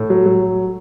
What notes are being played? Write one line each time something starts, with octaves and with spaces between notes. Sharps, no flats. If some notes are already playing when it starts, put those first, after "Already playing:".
Already playing: A2
F#3
F#3